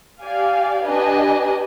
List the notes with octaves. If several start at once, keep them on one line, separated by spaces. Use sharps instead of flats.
G4 D5 F5 G#5
D4 G4 B4 D#5 G#5